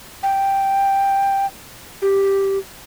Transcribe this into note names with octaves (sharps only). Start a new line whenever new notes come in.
G5
G4